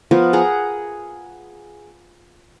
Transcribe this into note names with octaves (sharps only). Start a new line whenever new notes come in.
F3 B3 F4 A#4
G#4 F#5 A#5